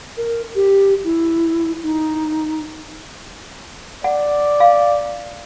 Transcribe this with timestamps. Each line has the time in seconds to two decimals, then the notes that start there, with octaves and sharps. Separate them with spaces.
0.17 A#4
0.55 G4
1.04 E4
1.83 D#4
4.04 D5 F#5
4.60 F5